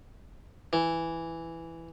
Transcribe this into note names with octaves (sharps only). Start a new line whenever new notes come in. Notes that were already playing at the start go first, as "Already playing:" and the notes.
E3